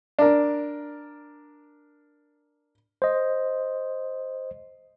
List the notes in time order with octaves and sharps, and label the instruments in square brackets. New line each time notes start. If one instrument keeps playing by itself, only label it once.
[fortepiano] D4 A#4
[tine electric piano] C5 D#5